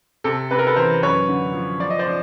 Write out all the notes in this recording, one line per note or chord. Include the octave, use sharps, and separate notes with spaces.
C3 A4
C3 B4
A#4
A4 B4
E3 A#4 C5
F#2 B4 C#5
D3
F3
F3 D5
D#5
C5 D5
F3